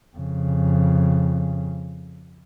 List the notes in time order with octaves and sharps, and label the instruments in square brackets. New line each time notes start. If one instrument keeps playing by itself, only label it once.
[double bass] F2 C#3